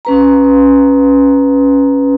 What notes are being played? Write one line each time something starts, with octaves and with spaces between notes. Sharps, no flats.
C#4 B4 A#5